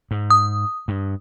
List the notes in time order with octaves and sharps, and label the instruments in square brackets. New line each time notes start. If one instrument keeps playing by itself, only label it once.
[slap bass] G#2
[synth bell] D#6
[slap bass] G2